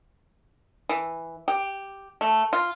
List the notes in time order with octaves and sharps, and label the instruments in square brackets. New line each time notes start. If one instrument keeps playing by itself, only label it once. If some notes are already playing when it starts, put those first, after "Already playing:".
[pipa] E3
G4
A3
F4